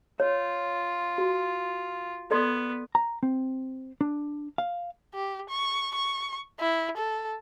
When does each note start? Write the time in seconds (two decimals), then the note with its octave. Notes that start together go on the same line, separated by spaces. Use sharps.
0.20 F4 C#5
1.18 F#4
2.31 B3 A4 D5 C6
2.95 A#5
3.23 C4
4.01 D4
4.58 F5
5.14 G4
5.49 C#6
5.95 C#6
6.60 E4
6.97 A4